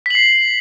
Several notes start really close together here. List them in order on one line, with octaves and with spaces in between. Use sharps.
B6 F#7 C7